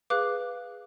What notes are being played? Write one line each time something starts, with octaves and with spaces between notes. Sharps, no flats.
G#4 B4 F5 D6 F#6